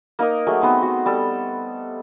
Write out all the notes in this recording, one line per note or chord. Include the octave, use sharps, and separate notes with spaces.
A#3 D#4 A#4 D#5
F#3 A3 G#4
B3 C4 D#4 C5
F#4
G3 A4